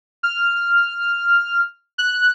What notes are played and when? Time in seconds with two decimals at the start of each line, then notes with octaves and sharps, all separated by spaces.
0.23 F6
1.98 F#6